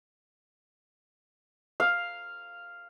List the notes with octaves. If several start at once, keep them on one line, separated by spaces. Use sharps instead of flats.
F5